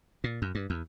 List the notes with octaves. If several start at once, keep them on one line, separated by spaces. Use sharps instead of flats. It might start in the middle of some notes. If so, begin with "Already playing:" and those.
A#2
F#2
G2
E2